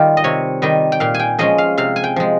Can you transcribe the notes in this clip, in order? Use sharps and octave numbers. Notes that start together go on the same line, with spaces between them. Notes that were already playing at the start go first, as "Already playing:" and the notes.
Already playing: D#3 G3 F4 G4
D#5
C3 C#5
D#3 G3 D#5
G5
A#2 F5
G#5
G5
F3 G#3 C#4 D#5
F5
C3 F5
G#5
G5
F3 G#3